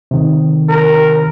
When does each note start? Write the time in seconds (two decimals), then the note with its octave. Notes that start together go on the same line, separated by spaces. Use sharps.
0.11 C3 D#3
0.69 A#4